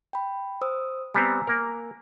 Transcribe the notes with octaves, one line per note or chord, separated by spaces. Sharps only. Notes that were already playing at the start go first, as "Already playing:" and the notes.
G5 B5
C5 D#6 E6
G3 B3 C4 G#5 A#5 E6
A#3 A#4